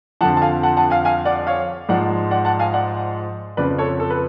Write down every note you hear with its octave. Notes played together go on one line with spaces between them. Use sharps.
F2 D3 F3 F#5 A5
A5
F5 G#5
F#5 A5
F#5 A5
F5 G#5
F5 G#5
D5 F#5
C#5 F5
G#2 F3 D5 F#5
D5 F#5
F#5 A5
F5 G#5
D5 F#5
F2 C#3 F3 B4 D5
A4 C#5
A4
B4